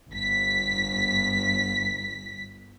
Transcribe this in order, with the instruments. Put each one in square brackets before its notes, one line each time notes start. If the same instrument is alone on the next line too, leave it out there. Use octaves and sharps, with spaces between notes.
[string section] G1 B6